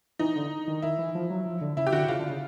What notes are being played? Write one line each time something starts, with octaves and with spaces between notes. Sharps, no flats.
E3 D#4
D3
D#3
D#3 E4
E3
F3
F#3
F3
D3
C#3 E4
G4
D3 F#4
C#3 F4
D3
C#3